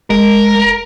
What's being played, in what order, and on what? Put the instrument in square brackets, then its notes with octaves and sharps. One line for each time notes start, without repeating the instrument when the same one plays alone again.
[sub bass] F1 [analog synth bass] G#3 [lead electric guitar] A#4